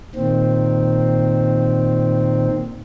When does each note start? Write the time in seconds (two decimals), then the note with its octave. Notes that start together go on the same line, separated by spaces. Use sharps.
0.15 A#2 D#3 C4